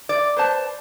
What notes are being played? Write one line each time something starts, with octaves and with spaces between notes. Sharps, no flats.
D5
B4 C5 A5